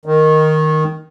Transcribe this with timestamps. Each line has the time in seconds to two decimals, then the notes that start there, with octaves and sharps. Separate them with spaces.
0.05 D#3